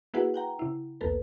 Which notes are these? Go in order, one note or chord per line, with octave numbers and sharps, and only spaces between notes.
A#3 E4 F#4 G#4 B4 F#5
F#5 G5 A#5
C#3 E4
B1 E2 A#3 A4 B4